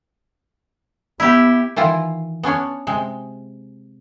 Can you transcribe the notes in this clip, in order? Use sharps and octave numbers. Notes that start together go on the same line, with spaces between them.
B3 E4 G4
D#3 E3 E4 F4
B3 C#4 D4 C#5
C3 G#3